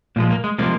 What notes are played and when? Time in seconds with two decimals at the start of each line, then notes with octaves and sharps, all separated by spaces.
0.16 A#2 F3 G#3 A#3
0.30 A#3
0.44 G#3
0.58 C3 F3 G#3 A#3